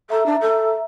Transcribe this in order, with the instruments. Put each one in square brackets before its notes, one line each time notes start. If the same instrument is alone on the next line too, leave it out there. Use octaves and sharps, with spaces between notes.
[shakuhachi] A4 [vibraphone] E5 A#5
[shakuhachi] D4
A4